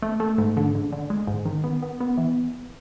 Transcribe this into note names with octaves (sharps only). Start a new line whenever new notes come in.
A3
A3
G#2
D3
D3
D3
G#3
G#2
D#3
B3
B3
B3
E3